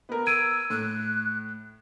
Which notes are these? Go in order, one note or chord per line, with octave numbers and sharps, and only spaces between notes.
B3 A#4
E6 G#6 D7 D#7
A2 F#6